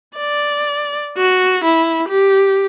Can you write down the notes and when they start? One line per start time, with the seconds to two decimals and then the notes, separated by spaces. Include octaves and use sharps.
0.17 D5
1.17 F#4
1.64 E4
2.08 G4